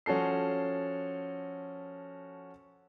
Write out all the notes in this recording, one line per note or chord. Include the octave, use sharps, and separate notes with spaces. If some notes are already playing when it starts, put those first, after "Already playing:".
F3 C#4 F#4 A4 C7